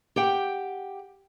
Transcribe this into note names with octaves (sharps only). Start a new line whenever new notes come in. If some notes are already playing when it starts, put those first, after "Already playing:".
G4 F#5 G5